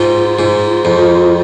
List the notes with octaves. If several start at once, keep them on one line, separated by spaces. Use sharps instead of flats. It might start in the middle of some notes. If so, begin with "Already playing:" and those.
Already playing: G#2 F4
G#2
F2